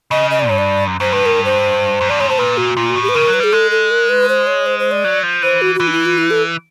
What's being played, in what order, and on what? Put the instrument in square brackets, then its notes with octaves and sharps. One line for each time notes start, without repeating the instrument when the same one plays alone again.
[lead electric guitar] C#3 [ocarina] D#5
[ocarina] D#5
D5
[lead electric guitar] G2 [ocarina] C#5
[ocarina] D5
[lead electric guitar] F#2
[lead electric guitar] F#2 [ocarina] C5
[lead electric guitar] G2 [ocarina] B4
[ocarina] A#4
C5
[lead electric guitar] F#2
[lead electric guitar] G2 [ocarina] D5
[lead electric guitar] G#2 [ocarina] C#5
[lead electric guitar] A2 [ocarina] C5
[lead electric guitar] A#2 [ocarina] B4
[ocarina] F#4
[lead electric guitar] A#2 [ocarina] F4
[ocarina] F#4
[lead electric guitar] A2
[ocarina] G4
B4
[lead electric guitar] C#3 [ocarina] A#4
[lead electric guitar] F#3
[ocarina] B4
[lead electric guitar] G3 [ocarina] G#4
[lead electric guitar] G#3 [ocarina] A4
[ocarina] A4
A#4
B4
C5
C#5
C5
C5
D5
[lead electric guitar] F#3
F3
[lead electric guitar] E3 [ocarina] C5
[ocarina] F#4
F#4
[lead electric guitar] E3 [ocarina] F4
[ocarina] D#4
E4
F4
E4
A4